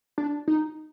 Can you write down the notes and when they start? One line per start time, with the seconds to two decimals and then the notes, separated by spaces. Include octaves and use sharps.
0.18 D4
0.48 D#4